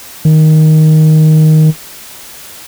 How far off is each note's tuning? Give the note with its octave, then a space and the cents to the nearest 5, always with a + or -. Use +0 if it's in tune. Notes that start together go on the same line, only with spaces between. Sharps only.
D#3 +5